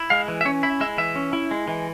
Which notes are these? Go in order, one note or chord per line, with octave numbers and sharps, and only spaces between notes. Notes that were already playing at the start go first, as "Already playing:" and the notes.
Already playing: E4
G#3 F5
E3
E5
C#4 C#5
E4 E5
G#3 E5
E3 E5
C#4
E4
G#3
E3